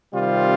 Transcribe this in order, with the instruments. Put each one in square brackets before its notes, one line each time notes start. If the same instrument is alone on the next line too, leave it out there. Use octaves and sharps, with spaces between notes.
[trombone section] C3 D#3 G3 C4 F4